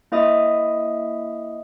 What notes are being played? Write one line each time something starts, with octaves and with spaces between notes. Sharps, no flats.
A#3 E4 D#5 E5 D#6